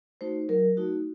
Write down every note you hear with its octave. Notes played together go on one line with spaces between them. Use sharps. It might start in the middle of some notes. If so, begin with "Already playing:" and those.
A3 D#4 F#4 C5
F#3 A#4
A3 D#4 F#4